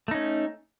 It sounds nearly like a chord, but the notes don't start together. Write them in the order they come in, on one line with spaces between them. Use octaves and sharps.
A3 D#4 C#4